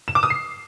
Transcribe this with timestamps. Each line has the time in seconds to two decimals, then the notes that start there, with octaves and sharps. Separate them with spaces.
0.08 E7
0.15 D6
0.23 D#6
0.30 C7